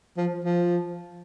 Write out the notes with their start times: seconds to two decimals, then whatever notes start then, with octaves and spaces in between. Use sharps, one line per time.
0.18 F3
0.44 F3